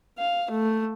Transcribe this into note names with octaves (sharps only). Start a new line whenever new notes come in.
F5
A3